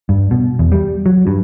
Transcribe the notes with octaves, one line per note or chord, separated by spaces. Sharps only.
G2
B2
E2
G3
F#3
G2